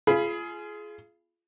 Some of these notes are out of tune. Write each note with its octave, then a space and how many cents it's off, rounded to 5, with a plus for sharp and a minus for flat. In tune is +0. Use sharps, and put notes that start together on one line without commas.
F4 -25 G#4 +20 B5 +0